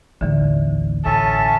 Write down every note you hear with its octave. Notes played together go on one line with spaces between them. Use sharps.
A1 D#2 D3 E3
A1 C#4 A4 E5 A5